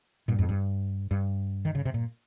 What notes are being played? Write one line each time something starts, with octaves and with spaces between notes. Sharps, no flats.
G2 A#2
F2 G#2
G2
G2
D#3
C#3
C3
A#2